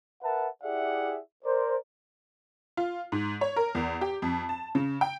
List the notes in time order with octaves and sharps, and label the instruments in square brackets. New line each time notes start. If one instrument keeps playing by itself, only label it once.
[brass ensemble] A#4 B4 E5 F#5 A5
E4 G4 G#4 D5 E5 F#5
A#4 C5 D5
[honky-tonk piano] F4
G#2
C#5
A#4
E2
G4
F2
A5
C#3
G5